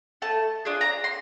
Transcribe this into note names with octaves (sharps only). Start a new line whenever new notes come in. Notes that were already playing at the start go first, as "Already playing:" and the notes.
A3 A5
D4 F4 G#4
A#5
C6